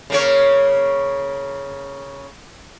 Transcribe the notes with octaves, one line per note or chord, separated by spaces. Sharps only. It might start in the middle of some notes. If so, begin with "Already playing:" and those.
C#3 A#3 C#5